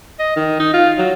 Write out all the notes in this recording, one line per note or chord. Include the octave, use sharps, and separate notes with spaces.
D#5
D#3
D#4
F4
F#3